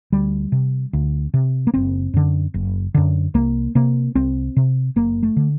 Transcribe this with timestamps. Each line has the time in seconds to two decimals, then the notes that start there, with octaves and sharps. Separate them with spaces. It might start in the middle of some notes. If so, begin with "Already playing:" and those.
0.12 D2 G3
0.52 C3
0.93 D2
1.34 C3
1.67 A#3
1.74 F#1 C4
2.14 F#2 D3
2.54 F#1
2.94 F#2 D3
3.34 C2 A#3
3.75 C3 A#3
4.15 C2 C4
4.57 C3
4.96 F#1 A#3
5.23 A3
5.36 D3